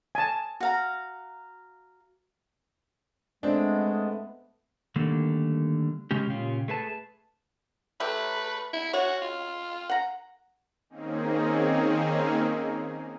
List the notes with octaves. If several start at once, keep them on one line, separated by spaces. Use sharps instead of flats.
G#5 A5
F#4 F5 A#5
G#3 A3 B3 C4 D4
D3 D#3 G3 A3 A#3
C#3 G#3 C#4 G4
A#2 C#3 C#4 F4 G4
A3 G#4 B4 A5
A3 E4 G4 B4
E4
F#4 C#5
F4
F#5 A#5
D#3 A#3 C4 C#4 D#4 G#4